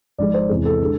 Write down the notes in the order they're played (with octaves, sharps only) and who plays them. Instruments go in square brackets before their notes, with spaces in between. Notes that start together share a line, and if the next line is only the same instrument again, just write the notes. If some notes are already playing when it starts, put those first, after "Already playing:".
[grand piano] G#1 G#2 F3 G#3 D5
C5
E2 C3 G#3
A4
D3 G#3